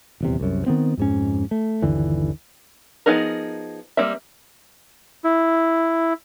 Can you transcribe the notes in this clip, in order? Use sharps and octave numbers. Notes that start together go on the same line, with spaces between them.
D#1 E2 C3
C2 F#2
D#3 B3 C4
F2 G#2 C#4
A3
G1 D#2 D3 E3
F3 B3 D#4 G#4 A#4
G3 A#3 C4 E5
E4